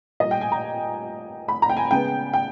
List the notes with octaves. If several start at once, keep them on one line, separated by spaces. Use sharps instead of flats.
A#2 G3 A#3 D#5
G5
G#5
A#5
B5
A#5
G5
G#5
C#3 G#3 B3 G5
G5